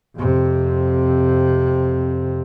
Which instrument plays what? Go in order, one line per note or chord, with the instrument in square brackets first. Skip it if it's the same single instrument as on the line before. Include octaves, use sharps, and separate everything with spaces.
[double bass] F2 C3